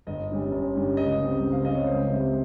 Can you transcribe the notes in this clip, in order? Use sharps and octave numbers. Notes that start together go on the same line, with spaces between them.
G1 D#5
G2 G3 C#4
G1
G2 G3 C#4
C#2 D#5
C#3 G3 C4
C#2
F5
C#3 G3 C4 D#5
C#5
C#2 C5
C3 G3